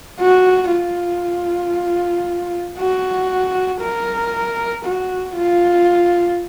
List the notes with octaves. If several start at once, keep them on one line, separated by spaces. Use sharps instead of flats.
F#4
F4
F#4
A#4
F#4
F4